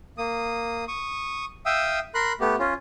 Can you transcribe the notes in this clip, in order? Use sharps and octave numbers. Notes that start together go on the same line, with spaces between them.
A#3 D#6
C#6 D#6
E5 F5 G5 D#6 E6
A#4 B5 C6 F#6
A3 B3 G4
C#4 F4